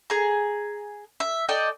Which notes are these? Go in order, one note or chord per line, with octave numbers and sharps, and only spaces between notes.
G#4 A#5
E5
A4 D5 D#5 G5